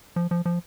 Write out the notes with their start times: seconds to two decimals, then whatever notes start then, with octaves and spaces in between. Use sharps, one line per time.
0.16 F3
0.31 F3
0.46 F3